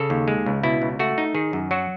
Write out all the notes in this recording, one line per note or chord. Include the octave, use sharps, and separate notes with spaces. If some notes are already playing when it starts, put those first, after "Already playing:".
Already playing: C#3 A4
D#2
G#3
C#2
B2 E4
C#2
A3 F#4
D#4
D#3 G#4
F#2
F#3 F#4